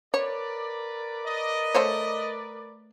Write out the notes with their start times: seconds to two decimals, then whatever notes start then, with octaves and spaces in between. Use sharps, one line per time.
0.14 A#4 B4 C#5 D5
1.25 D#5
1.74 A3 C5 C#5